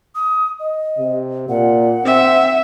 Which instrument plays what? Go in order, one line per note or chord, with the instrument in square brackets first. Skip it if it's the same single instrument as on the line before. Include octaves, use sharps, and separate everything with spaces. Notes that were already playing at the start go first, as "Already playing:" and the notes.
[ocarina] D#6
D#5
[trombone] C3
[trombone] A#2 [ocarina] F#5
[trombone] C4 [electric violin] E5